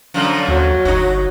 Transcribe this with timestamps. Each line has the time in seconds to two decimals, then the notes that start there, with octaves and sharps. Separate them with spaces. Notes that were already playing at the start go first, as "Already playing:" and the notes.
0.14 F#2 D3 F3
0.48 D#2 F#3
0.85 G1 D#4 F#4